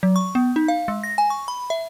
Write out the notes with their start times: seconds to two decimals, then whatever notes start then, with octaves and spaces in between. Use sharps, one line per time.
0.03 F#3
0.16 C#6
0.35 B3
0.56 D#4
0.68 F5
0.88 G#3
1.03 A#6
1.18 G#5
1.30 C#6
1.48 B5
1.70 E5